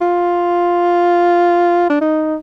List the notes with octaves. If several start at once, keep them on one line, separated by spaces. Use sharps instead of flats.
F4
D4
D#4